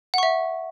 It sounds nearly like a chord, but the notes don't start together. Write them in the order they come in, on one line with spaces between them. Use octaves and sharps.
F#5 C#6 E5